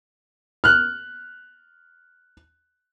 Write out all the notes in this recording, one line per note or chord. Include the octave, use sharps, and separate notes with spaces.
F6 F#6